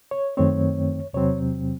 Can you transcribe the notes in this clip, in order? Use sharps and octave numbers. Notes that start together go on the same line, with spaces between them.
C#5
F#2 D#3 A3 C4 C#5
E2 C3 F#3 C4 C#5